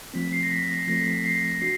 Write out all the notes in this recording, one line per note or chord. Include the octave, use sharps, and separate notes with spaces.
F3 A3 C4 B6
C7
A#6
B6
A#6
F3 A3 C4 A#6
C7
D4 F#4 C7